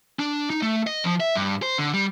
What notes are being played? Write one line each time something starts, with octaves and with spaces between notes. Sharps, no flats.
D4
D#4
A3
D#5
F3
E5
G2
C5
D3
G3